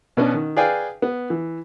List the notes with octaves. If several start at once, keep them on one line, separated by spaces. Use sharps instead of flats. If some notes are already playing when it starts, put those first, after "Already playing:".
B2 B3 C#4 D4
D#3
G#4 B4 D5 F5 G5 G#5
B3
E3